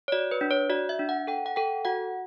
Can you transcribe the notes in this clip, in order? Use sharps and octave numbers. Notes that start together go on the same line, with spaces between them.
C#5
F#4 D5
B4
D4
C#5
F#4 D5
E5
D4
F#5
A4 G5
F#5
A4 G5
F#4 F#5